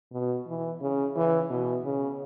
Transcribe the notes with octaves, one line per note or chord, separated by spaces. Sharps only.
B2
E3
C#3
E3
B2
C#3